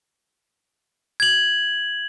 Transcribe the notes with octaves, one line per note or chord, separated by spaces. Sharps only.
G#6 F#7